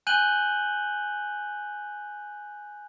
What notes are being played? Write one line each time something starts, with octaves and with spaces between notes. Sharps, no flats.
G#5 F#6 G6 D#7 F#7 G7